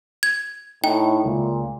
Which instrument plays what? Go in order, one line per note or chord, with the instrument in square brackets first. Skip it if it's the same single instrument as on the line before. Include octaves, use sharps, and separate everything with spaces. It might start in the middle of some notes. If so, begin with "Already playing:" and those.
[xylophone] G#6
[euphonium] A2 [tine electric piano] D#4 [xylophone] G5
[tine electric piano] C#2 [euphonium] A#2